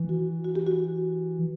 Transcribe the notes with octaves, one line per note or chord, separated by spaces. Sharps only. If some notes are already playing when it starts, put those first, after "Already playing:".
Already playing: E3
F#4
F#4
G4
F#4